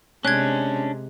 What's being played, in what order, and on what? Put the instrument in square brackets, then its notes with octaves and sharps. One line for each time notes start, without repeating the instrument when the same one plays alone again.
[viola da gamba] C3 G#3 [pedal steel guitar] C#4 D4 [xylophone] F#6 G#6